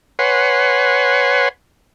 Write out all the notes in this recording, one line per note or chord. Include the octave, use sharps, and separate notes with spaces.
B4 C#5 F#5 G#5 C6